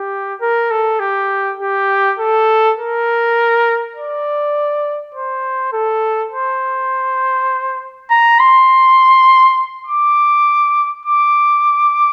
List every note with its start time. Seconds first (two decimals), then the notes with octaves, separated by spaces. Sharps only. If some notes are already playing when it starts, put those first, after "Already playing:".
Already playing: G4
0.41 A#4
0.71 A4
1.00 G4
1.60 G4
2.19 A4
2.78 A#4
3.96 D5
5.15 C5
5.73 A4
6.32 C5
8.11 A#5
8.40 C6
9.87 D6
11.06 D6